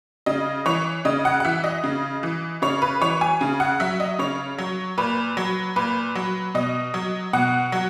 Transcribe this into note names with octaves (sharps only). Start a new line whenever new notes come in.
C#3 D#5
E3 C#5
C#3 D#5
F#5
F#5
E3 E5
D#5
C#3
E3
C#3 C#5
B4
E3 C#5
G#5
C#3
F#5
F#3 E5
D#5
C#3 C#5
F#3
A#2 B4
F#3
A#2 B4
F#3
B2 D#5
F#3
B2 F#5
F#3